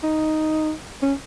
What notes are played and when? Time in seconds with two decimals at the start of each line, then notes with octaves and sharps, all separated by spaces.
0.03 D#4
1.02 C#4